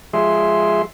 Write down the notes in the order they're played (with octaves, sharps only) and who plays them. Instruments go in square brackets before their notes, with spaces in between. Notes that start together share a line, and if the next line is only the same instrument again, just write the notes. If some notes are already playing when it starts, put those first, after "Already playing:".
[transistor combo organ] F3 G#3 G#4 E5 C6